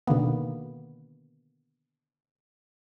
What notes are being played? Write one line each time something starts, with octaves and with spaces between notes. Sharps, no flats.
B2 D3 D#3 A#3 B3